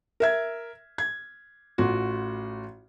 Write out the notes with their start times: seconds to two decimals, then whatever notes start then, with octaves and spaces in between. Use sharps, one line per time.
0.20 A#4 E5 G#6
0.98 G#6
1.78 A1 F4 F#4